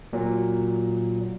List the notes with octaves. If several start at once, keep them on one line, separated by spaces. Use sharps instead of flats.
A#2 F#3